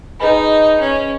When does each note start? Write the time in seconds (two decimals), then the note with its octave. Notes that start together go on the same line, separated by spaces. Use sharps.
0.20 D#4 G#4 B4 D#5 G#5 B5
0.81 C#4